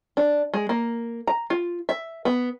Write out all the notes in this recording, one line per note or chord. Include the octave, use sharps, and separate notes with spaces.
D4
G#3
A#3
A#5
F4
E5
B3